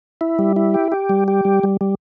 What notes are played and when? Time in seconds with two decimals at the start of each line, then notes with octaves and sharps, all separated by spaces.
0.21 E4
0.39 G3
0.56 E4
0.74 G4
0.92 G4
1.09 G3
1.28 G4
1.45 G3
1.63 G3
1.81 G3